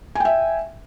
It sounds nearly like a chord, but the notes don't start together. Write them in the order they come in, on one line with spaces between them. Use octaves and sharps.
G#5 G5 E5